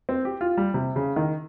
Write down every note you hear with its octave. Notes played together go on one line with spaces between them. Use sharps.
C4
G4
F4
G3
C3
C#3
D#3